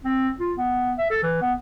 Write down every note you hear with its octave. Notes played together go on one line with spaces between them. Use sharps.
C4
F4
B3
E5
A4
E3
B3